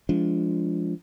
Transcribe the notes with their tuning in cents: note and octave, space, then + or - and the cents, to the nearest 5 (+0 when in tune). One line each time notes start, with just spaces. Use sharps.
F3 -15 G#3 +0 D4 -30